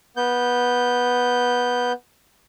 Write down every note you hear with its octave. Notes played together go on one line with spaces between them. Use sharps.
B3 G6